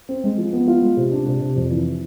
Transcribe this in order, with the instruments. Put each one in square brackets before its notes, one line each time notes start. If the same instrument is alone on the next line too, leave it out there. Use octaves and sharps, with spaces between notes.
[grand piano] C4
G#3
F3
B3
F4
G#3
C3
D4
C3
C3
F2
E3